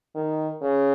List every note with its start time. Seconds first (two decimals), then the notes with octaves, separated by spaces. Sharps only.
0.15 D#3
0.62 C#3